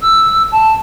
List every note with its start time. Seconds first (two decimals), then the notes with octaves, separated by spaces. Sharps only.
0.02 E6
0.51 A5